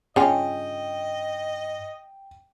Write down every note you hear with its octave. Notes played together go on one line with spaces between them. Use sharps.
G2 C#3 C#4 F4 D#5 G5